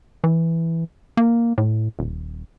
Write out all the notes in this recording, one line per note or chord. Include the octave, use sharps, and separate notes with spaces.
E3
A#3
A2
D#1